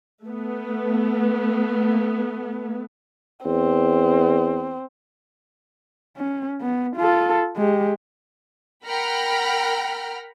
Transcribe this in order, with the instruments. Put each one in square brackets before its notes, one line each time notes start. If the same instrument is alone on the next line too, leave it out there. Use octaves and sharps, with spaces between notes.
[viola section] A3 B3
[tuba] E2 [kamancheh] C4
[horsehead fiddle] C#4
B3
F4 A4
G#3 G4
[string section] A#4 F#5 G5 A#5 B5 F6